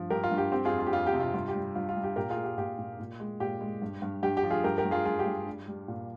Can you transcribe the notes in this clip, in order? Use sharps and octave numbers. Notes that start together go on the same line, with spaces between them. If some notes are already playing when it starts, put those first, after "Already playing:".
Already playing: G2 F3
G2 G4 A#4
F4
G2
G4
C4 G4
F4 G#4
F2
F4
G4
F2 F4
G4
C3
F4
G2 F4
G4
G3
G2 F4
F4
G3
G4
A#2 G4 A#4
F4 G#4
A#2
G4
A#2 G4
A#2
A#2
G#3
A#2 G4
G#3
G2
G2
G2 G4
G4
F3
F4 G#4
G2 G4 A#4
G4 A#4
G2
F4 G#4
G2 F4 G#4
G4
G2
G3
G3
A#2